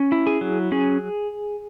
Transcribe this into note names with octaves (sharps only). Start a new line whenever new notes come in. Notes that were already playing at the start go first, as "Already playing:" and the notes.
Already playing: C#4
E4
G#4
F#3
C#4 G#4